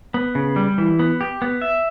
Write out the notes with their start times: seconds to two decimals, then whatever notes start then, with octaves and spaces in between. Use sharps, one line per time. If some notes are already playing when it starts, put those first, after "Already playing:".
0.14 B3
0.35 C#3
0.56 G3
0.78 E3
0.99 B3
1.21 G4
1.42 B3
1.62 E5